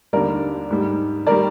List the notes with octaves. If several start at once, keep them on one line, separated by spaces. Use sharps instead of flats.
D#2 D3 G3 A#4 D5
G#2 G3
D#3 G3 A#4 D5